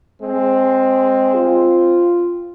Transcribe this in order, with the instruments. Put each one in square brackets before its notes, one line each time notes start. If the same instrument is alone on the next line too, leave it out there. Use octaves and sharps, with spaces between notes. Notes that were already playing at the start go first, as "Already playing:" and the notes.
[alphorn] G#3 [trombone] C4
[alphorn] F4